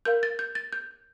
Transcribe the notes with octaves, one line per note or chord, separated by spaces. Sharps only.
A#4 F5 G6
A6
G6
A6
G6